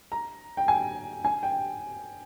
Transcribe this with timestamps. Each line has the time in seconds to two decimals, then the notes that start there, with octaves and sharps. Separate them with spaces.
0.12 A#5
0.57 G5
0.68 G#5
1.25 G#5
1.43 G5